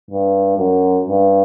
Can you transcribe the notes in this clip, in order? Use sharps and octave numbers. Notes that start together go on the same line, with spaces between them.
G2
F#2
G2